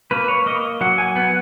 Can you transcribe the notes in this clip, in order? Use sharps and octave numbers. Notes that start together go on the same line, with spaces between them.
A#3 B4
C#5
A#3 D#5
F#3 F#5
G#5
B3 F#5